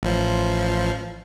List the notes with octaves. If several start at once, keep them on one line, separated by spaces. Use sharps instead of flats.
A1 F3